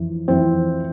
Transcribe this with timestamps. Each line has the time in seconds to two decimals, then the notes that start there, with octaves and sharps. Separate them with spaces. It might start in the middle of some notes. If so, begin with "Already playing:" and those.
Already playing: F2 E3
0.28 F2 E3 C4